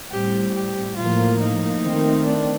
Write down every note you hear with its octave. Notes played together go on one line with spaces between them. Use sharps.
A2 G3 C4 G4
G4
A2 F3 A#3 F4
D#4
D#3 A3 C4
D4